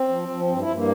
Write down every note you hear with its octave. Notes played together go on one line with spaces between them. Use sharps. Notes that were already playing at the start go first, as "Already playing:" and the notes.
Already playing: C4
F3
F3
G2 C4
E4
G2
A#3